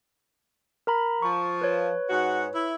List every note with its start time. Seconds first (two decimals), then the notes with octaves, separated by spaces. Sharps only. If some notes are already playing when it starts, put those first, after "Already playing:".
0.87 A#4 A#5 B5
1.22 F3 C#6
1.62 B4 C#5
2.09 G#2 F#4
2.55 E4